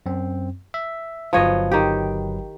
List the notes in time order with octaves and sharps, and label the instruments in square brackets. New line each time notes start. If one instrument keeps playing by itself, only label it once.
[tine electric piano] F#2 C4
E5
[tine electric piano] G1 F#3 B4 [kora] F3 C#5 D#5
[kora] D#3 G4